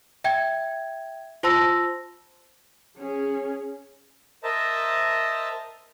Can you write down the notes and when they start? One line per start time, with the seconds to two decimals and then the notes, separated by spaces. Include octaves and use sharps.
0.24 E5 G5 G#6
1.43 F4 C5 A5 C6 E6 A#6
2.98 C#4 G#4
4.43 A#4 C5 D#5 E5 A5 A#5